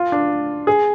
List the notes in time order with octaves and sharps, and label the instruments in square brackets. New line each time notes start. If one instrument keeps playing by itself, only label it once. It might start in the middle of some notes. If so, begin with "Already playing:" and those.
Already playing: [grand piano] F4
D4
G#4